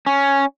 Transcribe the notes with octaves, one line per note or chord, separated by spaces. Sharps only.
C#4